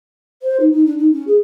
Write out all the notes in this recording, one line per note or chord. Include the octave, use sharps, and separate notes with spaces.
C5
D#4
D#4
D4
D#4
C#4
G#4